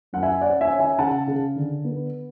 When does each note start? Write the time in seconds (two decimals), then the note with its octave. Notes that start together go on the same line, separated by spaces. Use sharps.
0.13 F#2 F#5
0.23 E5 G#5
0.41 C#4 D5 F#5
0.61 E5 G#5
0.70 C#4
0.79 E5 G#5
0.99 C#3 F#5 A5
1.27 C#3
1.56 D3
1.84 B3